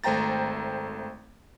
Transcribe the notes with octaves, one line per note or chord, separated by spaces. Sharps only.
G#1 A3 C5 G5 A#5 A6